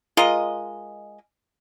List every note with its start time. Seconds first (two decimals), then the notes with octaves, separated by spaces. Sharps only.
0.17 G#3 F4 A#4 D#5